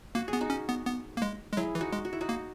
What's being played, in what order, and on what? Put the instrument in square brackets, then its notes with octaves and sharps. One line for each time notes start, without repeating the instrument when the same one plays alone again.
[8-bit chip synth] A#3 [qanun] F#4
[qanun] G#4
[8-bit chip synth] B3
[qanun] D#4 F#4
[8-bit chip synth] C#4
B3
B3
A#3
G#3
G#3
[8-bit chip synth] F#3 [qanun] E4 G#4
[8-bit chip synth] E3
[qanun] D#4 F#4
[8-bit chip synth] G#3
[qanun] F#4
E4
D#4 F#4
[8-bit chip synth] A#3